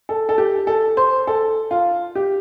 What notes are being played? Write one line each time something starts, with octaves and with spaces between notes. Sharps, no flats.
A4
A4
G4
A4
C5
A4
F4
G4